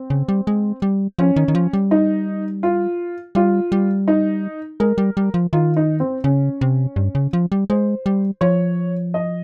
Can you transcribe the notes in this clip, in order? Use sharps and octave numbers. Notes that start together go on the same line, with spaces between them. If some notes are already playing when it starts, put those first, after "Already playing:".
Already playing: C4
C#3
G3
G#3
G3
F3 C#4
D#3
D#3
F3
G3
D#4
F4
G3 F4
G3
D#4
G#3 A#4
G3
G3
F3
D#3 F4
D#4
C4
C#3 C#4
C3
G2
C#3
F3
G3
G#3 C5
G3
F3 C#5
D#5